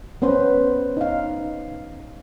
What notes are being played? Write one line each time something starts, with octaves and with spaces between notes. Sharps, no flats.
B3 C#4 B4 C5
D#4 F5